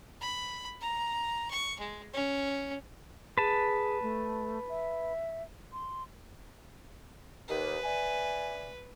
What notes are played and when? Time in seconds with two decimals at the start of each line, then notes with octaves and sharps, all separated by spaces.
0.21 B5
0.81 A#5
1.50 C#6
1.79 G#3
2.14 C#4
3.38 G#4 B4 A5
4.02 A3
4.69 E5
5.73 C6
7.48 D#2 B4
7.83 D5 E5 G#5